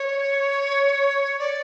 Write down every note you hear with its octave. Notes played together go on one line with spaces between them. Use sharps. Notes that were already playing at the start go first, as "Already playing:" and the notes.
Already playing: C#5
D5